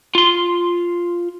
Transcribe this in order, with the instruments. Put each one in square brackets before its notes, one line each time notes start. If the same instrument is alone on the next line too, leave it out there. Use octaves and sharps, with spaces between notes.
[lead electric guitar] F4 C6